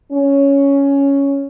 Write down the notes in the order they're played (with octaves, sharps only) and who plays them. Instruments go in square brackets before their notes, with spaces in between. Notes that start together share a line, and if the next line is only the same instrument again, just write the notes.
[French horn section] C#4